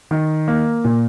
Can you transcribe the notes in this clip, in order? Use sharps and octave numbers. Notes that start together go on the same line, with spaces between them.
D#3
A#3
A#2